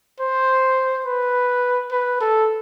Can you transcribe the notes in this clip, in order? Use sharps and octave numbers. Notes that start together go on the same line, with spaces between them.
C5
B4
B4
A4